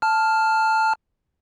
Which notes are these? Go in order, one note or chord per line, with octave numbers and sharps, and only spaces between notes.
A5 F6